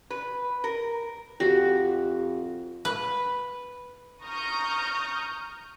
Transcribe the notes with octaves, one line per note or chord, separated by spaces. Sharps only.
B4
A#4
F2 F#4 G4
B4
A#5 C#6 D#6 F6 G6